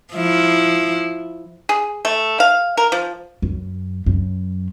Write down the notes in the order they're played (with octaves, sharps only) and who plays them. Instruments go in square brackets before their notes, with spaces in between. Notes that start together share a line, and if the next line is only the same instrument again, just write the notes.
[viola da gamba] F3 E4
[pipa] G#4
A3
F5
A#4
F3
[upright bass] F#2
F#2